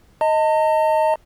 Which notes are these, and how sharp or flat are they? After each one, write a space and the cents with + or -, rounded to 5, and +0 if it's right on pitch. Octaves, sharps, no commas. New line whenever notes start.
D#5 +10 A5 +40